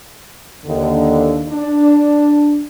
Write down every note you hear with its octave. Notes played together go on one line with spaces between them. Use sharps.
D#2 D3
D4